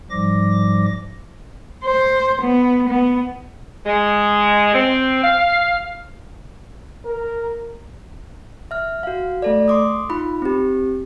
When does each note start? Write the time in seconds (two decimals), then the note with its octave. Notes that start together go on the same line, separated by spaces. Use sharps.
0.10 G#2 F3 G3 D6 A#6
1.84 C5
2.42 B3
2.89 B3
3.86 G#3
4.74 C4
5.23 F5
7.05 A#4
8.71 E5 F6
9.03 F#4 F5
9.42 A3 A4 D5
9.68 C6 D6 D#6
10.09 D#4 F4 B5
10.42 C4 G4